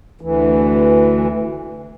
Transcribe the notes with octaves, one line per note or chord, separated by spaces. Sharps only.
D2 E3